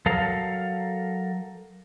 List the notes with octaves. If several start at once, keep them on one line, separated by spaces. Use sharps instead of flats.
F#3 A4 A#4 F5